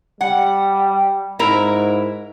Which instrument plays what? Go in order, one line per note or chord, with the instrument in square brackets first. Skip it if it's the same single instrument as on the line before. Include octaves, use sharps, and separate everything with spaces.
[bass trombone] G3 [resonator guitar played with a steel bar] F#5
[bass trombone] G#2 [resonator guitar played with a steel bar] E4 A#4